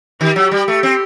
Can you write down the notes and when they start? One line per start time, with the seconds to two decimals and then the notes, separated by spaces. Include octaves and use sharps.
0.21 D#3 G4
0.36 F#3
0.52 G3
0.68 A3
0.83 C4